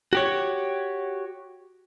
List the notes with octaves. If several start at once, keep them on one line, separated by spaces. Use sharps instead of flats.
F#4 G4 C#5